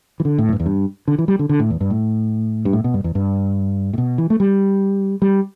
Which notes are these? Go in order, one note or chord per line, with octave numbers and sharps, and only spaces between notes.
E3
D3
A2
E2
G2
E2
G2
D3
E3
G3
D3
D3
A2
E2
G2
A2
G2
A2
B2
G2
E2
G2
A2
B2
E3
A3
G3
G3